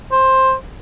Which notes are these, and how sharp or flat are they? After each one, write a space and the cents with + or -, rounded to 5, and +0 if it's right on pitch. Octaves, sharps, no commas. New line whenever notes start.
C5 +10